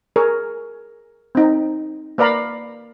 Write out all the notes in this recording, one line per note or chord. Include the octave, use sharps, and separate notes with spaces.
G#4 A#4 C#5
C4 D#4
A#3 B4 D5 F5 A#5 B5